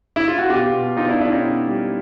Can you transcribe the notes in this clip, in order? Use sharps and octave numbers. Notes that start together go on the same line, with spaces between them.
E4
F4
F#4
B2 F4 G4
B2
B2 D#4 F4
D4 E4
B2 D4 E4
C#4 D#4
B2
G3